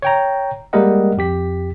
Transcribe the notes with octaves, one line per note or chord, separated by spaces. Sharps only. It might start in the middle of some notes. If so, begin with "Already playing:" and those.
C#5 G5 A#5
G3 G#3 A#3 A#4 D#5 F#5
F2 G4 B6